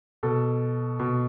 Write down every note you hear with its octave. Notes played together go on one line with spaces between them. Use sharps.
B2 A4
B2